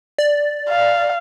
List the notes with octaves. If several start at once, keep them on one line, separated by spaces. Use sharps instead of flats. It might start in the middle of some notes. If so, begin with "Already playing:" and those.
D5
F5